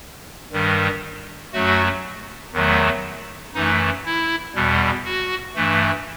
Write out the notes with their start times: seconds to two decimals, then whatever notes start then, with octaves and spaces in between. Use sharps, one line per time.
0.52 G2 D#3 G3
1.53 F#2 F#3 A3 F#4
2.53 E2 D#3 F#3 A3
3.54 F#2 E3 A3 D#4
4.05 E4
4.55 E2 B2 G3
5.05 F#4
5.55 G2 E3 A3